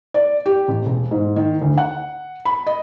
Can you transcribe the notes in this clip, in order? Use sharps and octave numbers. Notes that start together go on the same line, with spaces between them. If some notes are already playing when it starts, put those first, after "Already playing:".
D5
G4
A1
E1
G#2
D#3
D2
F#5
B5
D#5